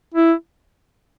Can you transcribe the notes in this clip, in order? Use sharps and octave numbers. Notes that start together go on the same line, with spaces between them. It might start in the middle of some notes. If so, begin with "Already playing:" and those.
E4